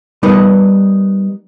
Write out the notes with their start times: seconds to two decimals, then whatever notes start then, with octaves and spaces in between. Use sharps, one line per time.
0.23 G3 B3 D#4 A#4 B4